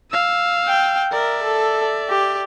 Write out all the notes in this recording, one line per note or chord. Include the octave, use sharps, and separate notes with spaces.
F5 E6
G5
A#4 D5 E5
A4
G4